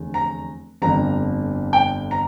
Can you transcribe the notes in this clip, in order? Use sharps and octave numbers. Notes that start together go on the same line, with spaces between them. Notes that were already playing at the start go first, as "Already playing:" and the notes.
Already playing: F1 E2 D3
A#5
G1 F2 D3 A#5
G5
A#5